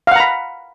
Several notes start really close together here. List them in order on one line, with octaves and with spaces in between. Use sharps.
F5 F#5 A#5 B5